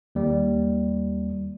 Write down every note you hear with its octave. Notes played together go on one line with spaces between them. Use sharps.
D#2 G3